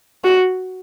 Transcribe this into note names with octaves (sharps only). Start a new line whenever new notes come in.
F#4